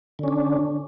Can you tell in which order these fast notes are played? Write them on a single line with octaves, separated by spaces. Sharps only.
D3 C#4 D4